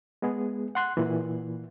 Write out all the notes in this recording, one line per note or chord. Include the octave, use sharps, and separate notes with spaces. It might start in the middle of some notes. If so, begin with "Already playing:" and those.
G#3 B3 G#4
F#5 C6 F#6
A#2 E3